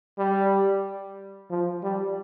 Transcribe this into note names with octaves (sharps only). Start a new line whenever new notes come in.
G3
F3
G3